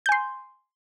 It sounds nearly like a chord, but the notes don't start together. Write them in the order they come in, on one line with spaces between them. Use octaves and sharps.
G6 G#5 C6